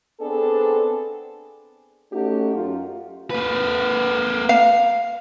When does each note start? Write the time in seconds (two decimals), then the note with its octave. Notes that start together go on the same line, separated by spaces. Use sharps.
0.20 B3 C4 D4 G#4 A4 B4
2.12 A3 C#4 D#4 F#4 G4
2.54 F#2 F4
3.30 A#3 B4
4.49 F5